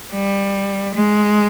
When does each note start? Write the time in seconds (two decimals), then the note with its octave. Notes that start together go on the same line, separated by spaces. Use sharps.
0.13 G3
0.95 G#3